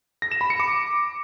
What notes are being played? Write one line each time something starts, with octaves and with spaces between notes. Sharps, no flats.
A#6
E7
B5
C#7
D6